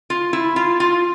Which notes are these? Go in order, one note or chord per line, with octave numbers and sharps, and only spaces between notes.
F4
E4
F4
F4